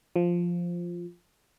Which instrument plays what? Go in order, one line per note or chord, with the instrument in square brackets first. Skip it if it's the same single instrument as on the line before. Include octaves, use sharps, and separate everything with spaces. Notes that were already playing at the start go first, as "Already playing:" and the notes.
[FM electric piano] F3